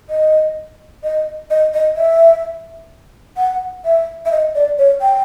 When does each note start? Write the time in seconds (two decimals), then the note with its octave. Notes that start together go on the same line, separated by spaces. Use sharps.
0.10 D#5
1.04 D#5
1.50 D#5
1.74 D#5
1.97 E5
3.37 F#5
3.85 E5
4.25 E5
4.32 D#5
4.55 D5
4.79 C#5
5.01 G5